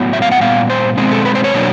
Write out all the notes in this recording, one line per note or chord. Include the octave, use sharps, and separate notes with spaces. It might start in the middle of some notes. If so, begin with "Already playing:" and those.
Already playing: A2 F#3 B3
E5
F5
F#5
A#2 G3 B3 F5
C5
B2 G#3 C4
A4
B4
C5
C#5
B2 F#3 A#3 D4